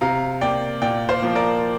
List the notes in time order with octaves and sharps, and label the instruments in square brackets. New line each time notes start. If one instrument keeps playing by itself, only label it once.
[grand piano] C3 F5 A#5
A#3 D5 G5
A#2 D5 G5
C5 F5
F3 A#3
A#4 D5